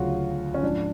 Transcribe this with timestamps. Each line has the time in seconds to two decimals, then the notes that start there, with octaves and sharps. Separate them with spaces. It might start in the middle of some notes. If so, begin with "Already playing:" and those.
Already playing: D2 C#3 F#3 F4 F#4
0.54 C#4
0.63 G#2 F3 D4